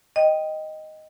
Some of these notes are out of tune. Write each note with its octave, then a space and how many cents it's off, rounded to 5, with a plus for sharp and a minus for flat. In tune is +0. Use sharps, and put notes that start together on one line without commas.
D#5 +0 G5 +0